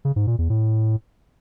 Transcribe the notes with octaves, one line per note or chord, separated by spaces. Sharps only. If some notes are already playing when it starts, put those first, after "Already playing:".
C#3
G#2
A#2
E2
A2